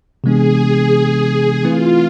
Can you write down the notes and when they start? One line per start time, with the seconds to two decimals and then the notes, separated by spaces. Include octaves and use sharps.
0.24 C3 E3 G#3 B3 D4 G#4
0.59 G#4
0.94 G#4
1.28 G#4
1.63 E3 A3 C4 E4 F4 B4